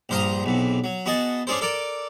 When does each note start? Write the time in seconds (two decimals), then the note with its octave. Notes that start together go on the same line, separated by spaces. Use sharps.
0.09 A#1 G2 C5 F5 A#5 D#6
0.44 B1 E2 C3
0.84 F#3
1.06 B3 F#4 G#4 D#5 A5
1.47 C#4 D4 G#4 A4 C5
1.61 A4 A#4 D5